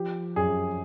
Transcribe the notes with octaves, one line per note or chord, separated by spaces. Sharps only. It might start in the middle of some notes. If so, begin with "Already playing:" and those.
Already playing: F3 G4
F#2 G#4